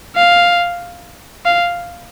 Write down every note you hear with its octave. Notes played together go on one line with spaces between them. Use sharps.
F5
F5